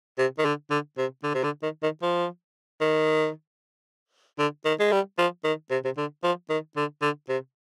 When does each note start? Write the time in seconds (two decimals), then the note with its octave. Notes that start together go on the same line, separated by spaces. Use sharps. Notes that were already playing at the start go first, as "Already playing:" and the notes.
0.18 C3
0.39 D#3
0.45 D3
0.70 D3
0.98 C3
1.24 D3
1.34 C3
1.44 D3
1.62 D#3
1.83 D#3
2.02 F3
2.81 D#3
4.39 D3
4.65 D#3
4.80 G#3
4.92 G3
5.19 F3
5.44 D#3
5.71 C3
5.85 C3
5.97 D3
6.24 F3
6.50 D#3
6.77 D3
7.02 D3
7.29 C3